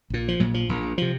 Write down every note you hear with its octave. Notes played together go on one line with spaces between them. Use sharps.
A#1 A#2
F3
A#1 A#2 F#3
F3
A#1 A#2
C3 F3